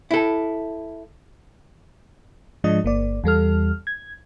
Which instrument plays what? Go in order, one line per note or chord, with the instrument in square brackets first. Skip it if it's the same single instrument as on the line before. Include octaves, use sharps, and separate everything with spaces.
[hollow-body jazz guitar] E4 A4
[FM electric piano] G#2 F3 G#3 D4 D#5
G1 A#3 D5
E2 G3 A4 F6
G#6